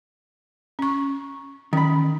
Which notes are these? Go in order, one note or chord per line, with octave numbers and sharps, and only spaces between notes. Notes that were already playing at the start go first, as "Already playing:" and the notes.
C#4 C#6
D#3 C#4 B5